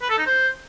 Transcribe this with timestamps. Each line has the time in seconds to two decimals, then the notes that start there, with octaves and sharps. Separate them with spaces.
0.01 B4
0.10 A4
0.18 D#4
0.26 C5